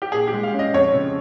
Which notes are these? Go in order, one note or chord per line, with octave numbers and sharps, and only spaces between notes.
G4
A#2 G#4
G4
G#3
F5
C#4
D#5
F2 C#5
C#3